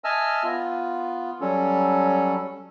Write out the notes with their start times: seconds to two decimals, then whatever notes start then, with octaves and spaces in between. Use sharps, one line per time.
0.04 D#5 E5 G#5 A5 E6 F6
0.44 B3 F4
1.41 F#3 G3 C#4 A4